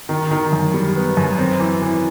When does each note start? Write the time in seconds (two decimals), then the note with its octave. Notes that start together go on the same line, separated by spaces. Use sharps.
0.09 D#3
0.31 D#3
0.52 F#2
0.74 G3
0.96 B3
1.17 F#2
1.38 C4
1.60 E3
1.82 E3